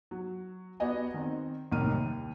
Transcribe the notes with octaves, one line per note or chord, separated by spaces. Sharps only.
F#3
B3 F#4 G4 D5 D#5 G#5
D#3 C4
C2 A2 D#3 A#3 F6 D#7
D#2